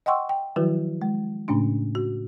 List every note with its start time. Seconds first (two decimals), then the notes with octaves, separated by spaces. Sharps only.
0.06 D#5 F#5 G5 C6 C#6 E6
0.29 G5
0.56 D#3 F3 F#3 E4 F#4 B4
1.02 G#3
1.48 A2 C#3 A3 C#4 D4
1.95 F#4